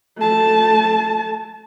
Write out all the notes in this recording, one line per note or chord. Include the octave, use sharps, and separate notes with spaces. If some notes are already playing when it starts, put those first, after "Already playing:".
A3 A5